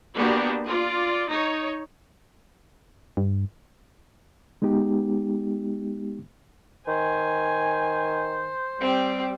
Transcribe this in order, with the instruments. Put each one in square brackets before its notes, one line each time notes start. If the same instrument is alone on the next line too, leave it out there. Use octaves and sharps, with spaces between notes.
[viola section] A#3 B3 D4 F#4 G4
F4 D5
D#4 C#5
[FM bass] G2
[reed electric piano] G#3 B3 D#4 G4
[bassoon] D#3 [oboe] C5 [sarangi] G#5
[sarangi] G3 [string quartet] C4 G4